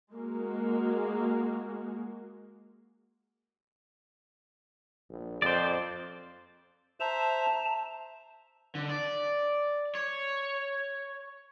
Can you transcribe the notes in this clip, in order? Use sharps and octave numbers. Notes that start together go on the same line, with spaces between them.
G#3 A#3 F#4 G#4
A#1
F2 C5 D5
C5 E5 A5 A#5
D3
D5
C#5